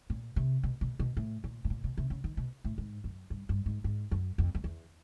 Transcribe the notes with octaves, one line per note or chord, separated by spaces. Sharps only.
A#2
C3
B2
B2
B2
A2
A#2
A2
A#2
B2
C3
C#3
D#3
B2
A2
G#2
F#2
G2
G2
G#2
G#2
F#2
F2
F2
E2